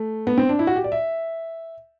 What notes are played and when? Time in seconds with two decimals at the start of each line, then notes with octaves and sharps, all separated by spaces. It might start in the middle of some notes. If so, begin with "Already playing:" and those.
Already playing: A3
0.27 B3
0.38 C4
0.49 D4
0.59 E4
0.67 F#4
0.75 G4
0.84 D5
0.92 E5